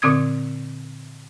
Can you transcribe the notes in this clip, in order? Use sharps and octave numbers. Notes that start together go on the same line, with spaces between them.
A#2 D3 C4 D#6 G#6